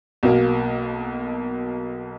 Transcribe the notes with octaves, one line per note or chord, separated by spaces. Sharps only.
B1 B2 A#3